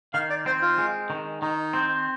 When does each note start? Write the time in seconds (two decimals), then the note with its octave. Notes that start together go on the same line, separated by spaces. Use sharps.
0.14 D#3 F5
0.30 D5
0.46 C4 C5
0.62 F4
0.78 G#3
1.10 D#3
1.42 D#3 D#4
1.73 C4